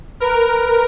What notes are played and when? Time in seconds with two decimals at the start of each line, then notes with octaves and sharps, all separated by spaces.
0.20 A#4 B4